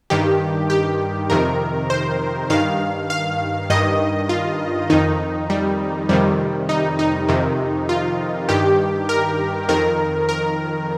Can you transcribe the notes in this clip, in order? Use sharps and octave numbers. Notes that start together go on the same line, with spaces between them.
G2 D#3 G4
G4
F2 C3 D#3 A#4
C5
G2 D#3 F5
F5
G2 D#3 D#5
F4
F2 D#3 D#4
G3
F2 C3 D#3 G3
D#4
D#4
F2 C3 D#3
F4
G2 D#3 G4
A#4
F2 D#3 A#4
A#4